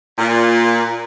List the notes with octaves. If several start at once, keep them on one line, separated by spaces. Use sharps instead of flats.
A#2